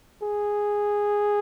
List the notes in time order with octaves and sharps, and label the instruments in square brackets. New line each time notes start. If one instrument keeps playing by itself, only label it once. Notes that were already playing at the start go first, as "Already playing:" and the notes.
[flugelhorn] G#4